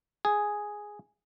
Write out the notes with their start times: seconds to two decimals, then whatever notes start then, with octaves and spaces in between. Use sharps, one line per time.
0.25 G#4